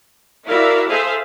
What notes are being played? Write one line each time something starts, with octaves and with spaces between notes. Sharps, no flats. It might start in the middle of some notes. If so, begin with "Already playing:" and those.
E4 F#4 A#4 D5 E5 F5
G#4 A4 C5 E5 F5